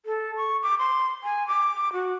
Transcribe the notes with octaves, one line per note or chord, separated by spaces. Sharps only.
A4
C#6
D6
C6
G#5
D6
F#4